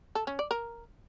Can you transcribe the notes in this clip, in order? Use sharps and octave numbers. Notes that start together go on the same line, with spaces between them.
A4
C#4
D5
A#4